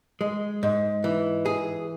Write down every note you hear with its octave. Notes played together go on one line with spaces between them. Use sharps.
G#3
G#2
E3
G#4